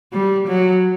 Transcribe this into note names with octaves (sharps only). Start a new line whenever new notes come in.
G3
F#3